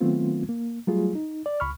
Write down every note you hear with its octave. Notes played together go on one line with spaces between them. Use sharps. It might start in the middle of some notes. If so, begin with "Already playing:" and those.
D#3 F#3 A3 B3 C4 F4
A#3
F#3 G3 A3 F4 G#4
D#4
D5
C#2 B5 C#6 F6